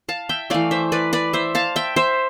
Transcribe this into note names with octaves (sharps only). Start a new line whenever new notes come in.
F5 A5
E5 G5
E3 A3 D5 F5
C5 E5
B4 D5
B4 D5
C5 E5
F5 A5
E5 G5
C5 E5